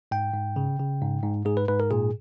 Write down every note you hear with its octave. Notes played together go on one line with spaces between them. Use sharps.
G#2 G5
G#2
C#3
C#3
G#2
G#2
G#2 G#4
B4
G#2 B4
A#4
A#2 G#4